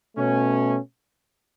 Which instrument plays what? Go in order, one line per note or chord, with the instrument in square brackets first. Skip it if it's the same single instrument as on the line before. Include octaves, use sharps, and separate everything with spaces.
[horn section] B2 A3 C#4